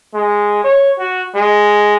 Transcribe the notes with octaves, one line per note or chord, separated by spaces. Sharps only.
G#3
C#5
F#4
G#3